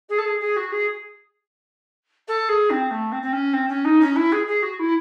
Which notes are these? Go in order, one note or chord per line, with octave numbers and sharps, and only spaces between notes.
G#4
A4
G#4
G#4
F#4
G#4
A4
G#4
C4
A3
C4
C4
C#4
C4
C#4
D#4
C#4
E4
G#4
G#4
F#4
E4